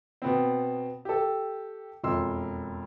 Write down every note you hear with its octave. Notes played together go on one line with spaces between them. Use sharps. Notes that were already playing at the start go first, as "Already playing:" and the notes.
B2 B3 C4
G4 A4
E1 F2 C6 E6